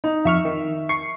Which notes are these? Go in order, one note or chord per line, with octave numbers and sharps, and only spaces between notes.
D#4
F2 E5 C#6 F6
D#3
C#6 C7